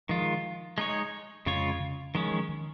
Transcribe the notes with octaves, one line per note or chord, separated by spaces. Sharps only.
D#3 F3 G#3 F4
G#3 D#4 C#5
F2 C#3 G#3 F4 C#5
C#3
D#3 F3 G#3 C#4
F3
D#3